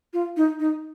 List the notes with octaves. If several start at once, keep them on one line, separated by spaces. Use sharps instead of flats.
F4
D#4
D#4